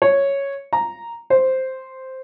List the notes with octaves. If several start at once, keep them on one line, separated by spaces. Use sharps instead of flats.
C#5
A#5
C5